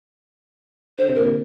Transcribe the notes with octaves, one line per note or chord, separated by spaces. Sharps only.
D3 C5
C3
A#4
A#2